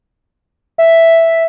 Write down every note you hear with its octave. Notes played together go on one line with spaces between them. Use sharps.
E5